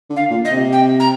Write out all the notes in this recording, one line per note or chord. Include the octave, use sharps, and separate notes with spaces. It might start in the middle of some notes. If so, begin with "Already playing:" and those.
D3
F5
A#2
D#5
C3
G5
A#5